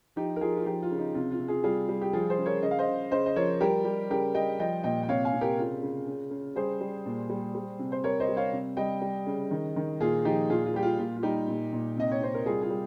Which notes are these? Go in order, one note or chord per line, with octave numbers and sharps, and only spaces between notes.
F3 D#4 G4
A#4
F3 F4 G#4
F4
F3 D#4 G4
F4
C#3
D#4
C3 F4
F4
C3
F4 G#4
G3 F4 G#4
G3
G4
F3 F4 G#4
G#4 C5
C#3
A#4 C#5
C#3 D#5
F5
C5 D#5
C#3
C#3 C5 D#5
D#5
F3 A#4 C#5
G3 G4 A#4
G3
C#3 G4 A#4
G3 D#5 G5
F3 D#5 G5
A#2 D#5 G5
G5
C3 C#5 F5
F5 G#5
C3
G4 A#4
C#3 F4
C#3
C#3
C#3
G3 G#4 C5
G3
A#2
G3
G3
C3
C5
G3 A#4 C#5
C5 D#5
G3
C#5 F5
C3
G3 D#5 G5
G3
C#3
D#3
D#3
A#2 F4 G#4
F3 D#4 G4
A#2 F4 G#4
F4
G3 G4
F4
A#2 F4
F4
G3 D#4 G4
A#2
A#2
C3 D#5
C#5
C3 C5
A#4
G3 F4 G#4
F4 G#4
G3